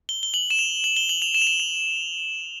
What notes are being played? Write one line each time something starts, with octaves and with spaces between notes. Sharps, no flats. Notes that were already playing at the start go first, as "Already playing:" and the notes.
G7
G7
F#7
E7
F7
F#7
G7
F#7
F7
E7
F7
E7
F7